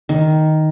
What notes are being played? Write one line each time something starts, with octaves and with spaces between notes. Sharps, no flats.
D#3